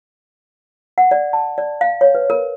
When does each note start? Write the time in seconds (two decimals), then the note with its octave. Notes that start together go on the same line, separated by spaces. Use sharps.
0.98 F#5
1.11 D5
1.33 A5
1.58 D5
1.81 F5
2.01 C#5
2.15 B4
2.30 A#4